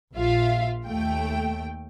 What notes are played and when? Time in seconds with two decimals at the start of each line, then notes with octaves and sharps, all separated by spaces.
0.15 A#1 F4 E5 F5
0.87 D#2 A3 G5